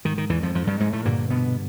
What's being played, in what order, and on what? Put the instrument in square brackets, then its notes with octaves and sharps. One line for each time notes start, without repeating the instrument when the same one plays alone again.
[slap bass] G#2 D#3
D#3
E2 E3
F2 F3
F2 F3
G2 G3
G#2 G#3
A2 A3
G2 A#2 D3 A#3
B2 B3